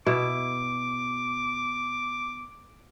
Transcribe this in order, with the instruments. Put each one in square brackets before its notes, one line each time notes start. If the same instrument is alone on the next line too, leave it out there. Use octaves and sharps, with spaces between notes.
[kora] B2 E4 [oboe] D6